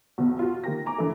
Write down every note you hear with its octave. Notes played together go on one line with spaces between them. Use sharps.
B1 E2
F4 F#4
D#3 A#3 G4 A#6
G#5 A#5 D6
D3 E3 A3